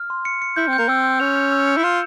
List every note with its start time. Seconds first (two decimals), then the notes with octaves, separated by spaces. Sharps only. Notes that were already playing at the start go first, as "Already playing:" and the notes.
Already playing: F6
0.10 C6
0.25 C#7
0.42 C#7
0.56 E4 G6
0.68 C4
0.73 G6
0.78 A#3
0.88 C4 E6
1.04 G6
1.20 C#4 F7
1.36 G6
1.52 E6
1.67 C#7
1.77 E4
1.83 F4 E7